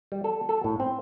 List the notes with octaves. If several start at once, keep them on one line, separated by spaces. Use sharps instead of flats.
G3
A4
A4
A2
C4